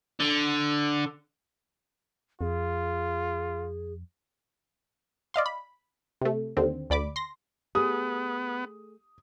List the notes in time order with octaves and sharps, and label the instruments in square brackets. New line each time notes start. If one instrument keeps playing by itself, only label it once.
[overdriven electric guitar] D3
[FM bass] F2 [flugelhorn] F4 [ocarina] G#4
[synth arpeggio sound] D5 D#5 F5 C6
B5
C3 A3
D#2 D3 C4
D2 D5 B5 D6
C6 A#6
[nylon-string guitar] A3 G#4 [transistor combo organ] B3 [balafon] G4 [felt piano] D#6